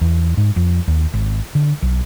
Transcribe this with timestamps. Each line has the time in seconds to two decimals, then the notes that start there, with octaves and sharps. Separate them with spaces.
0.01 E2
0.37 G#2
0.56 F2
0.88 D#2
1.13 G#1
1.55 D3
1.82 B1